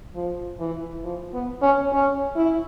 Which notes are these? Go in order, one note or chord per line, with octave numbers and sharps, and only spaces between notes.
F3
E3
F3
B3
C#4
C#4
E4